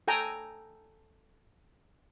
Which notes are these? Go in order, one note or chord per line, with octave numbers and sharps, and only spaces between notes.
A4 G5 G#5 A#5